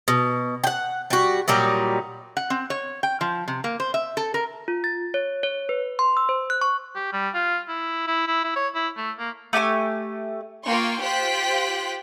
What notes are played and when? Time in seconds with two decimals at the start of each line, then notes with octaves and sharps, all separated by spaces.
0.08 B2
0.64 F#5 G5
1.10 G3 F#4
1.48 A#2 F#3 G3 D#4
2.37 F#5
2.50 C4
2.70 C#5
3.03 G5
3.21 F3
3.48 C3
3.64 A#3
3.80 C5
3.94 E5
4.17 A4
4.34 A#4
4.68 F4
4.84 A6
5.14 C#5
5.43 C#5
5.69 B4
5.99 C6
6.17 E6
6.29 C5
6.50 F#6
6.61 C#6
6.96 G4
7.13 G3
7.35 F4
7.69 E4
8.07 E4
8.27 E4
8.44 E4
8.56 C#5
8.75 E4
8.97 A3
9.19 A#3
9.53 A3 G4 G#5 C#6
10.66 A#3 F4 G5 C6 C#6
11.01 F4 G4 C5 G5 F#6 B6